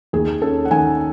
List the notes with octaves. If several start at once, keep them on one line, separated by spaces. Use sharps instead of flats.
D#2 G#4
C#4 A4
F#5
D#3 G#5